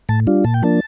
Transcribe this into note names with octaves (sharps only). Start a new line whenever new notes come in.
A2 A5
G3 D4 F4
A#2 A5
G5
F3 A#3 D4 A5